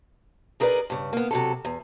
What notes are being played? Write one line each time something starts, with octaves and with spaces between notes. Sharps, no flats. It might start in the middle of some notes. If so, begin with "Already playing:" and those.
D#4 G#4 A#4 B4 D5
G2 C#3
A#3 B3
C3 F#3 A4
E2